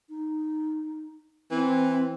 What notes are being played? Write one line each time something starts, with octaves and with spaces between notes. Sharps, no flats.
D#4
E3 C4